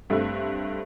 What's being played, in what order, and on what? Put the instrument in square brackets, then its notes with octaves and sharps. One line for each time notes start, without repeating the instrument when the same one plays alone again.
[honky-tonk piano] G2 A3 C4 E5